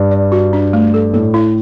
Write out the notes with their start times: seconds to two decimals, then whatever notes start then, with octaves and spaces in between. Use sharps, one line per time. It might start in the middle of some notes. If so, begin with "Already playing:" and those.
Already playing: G2
0.11 D5
0.32 F#4
0.53 D4
0.73 A3
0.94 A4
1.14 A2 A4
1.34 E4